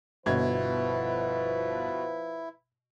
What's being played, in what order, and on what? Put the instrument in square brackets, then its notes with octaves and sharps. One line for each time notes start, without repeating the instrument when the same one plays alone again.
[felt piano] G1 G#6 [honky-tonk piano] B2 [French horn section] F3 B4 [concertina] E4